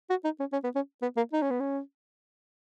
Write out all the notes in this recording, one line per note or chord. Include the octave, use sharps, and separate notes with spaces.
F#4
D#4
C#4
C#4
B3
C#4
B3
A#3
D#4
C#4
B3
C#4